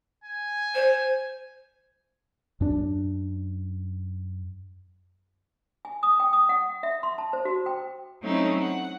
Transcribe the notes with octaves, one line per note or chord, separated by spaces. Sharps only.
G#5
C5
F#2 D4
G#5
D#6
G5
D#6
F#5
E5
C6
A5
C5
F#4
G5
F#3 A3 C4 C#4 D#4 E4
F#5